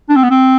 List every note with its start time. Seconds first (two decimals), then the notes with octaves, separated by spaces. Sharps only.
0.09 D4
0.16 C4
0.23 B3
0.31 C4